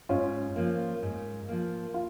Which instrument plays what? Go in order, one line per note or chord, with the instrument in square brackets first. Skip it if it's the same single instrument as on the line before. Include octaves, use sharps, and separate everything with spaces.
[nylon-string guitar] G#2 [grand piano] C#4 F4
[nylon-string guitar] F3 A#3
G#2
F3 A#3
[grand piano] F4